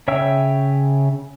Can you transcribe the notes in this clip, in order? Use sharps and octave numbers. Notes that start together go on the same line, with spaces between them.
C#3 C#5 E5 G5 E6